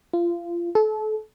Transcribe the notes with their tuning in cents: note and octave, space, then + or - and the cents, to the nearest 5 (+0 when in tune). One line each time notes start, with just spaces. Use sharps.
F4 -25
A4 -30